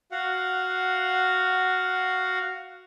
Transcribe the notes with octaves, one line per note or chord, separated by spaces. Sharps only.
F#4 F5 F#5